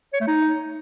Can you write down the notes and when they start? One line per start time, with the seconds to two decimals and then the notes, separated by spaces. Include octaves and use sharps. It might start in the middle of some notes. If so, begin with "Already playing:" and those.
0.13 C#5
0.20 A3
0.27 D#4